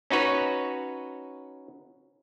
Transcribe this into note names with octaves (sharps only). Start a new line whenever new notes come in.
C#4 D#4 F#4 B4 C#5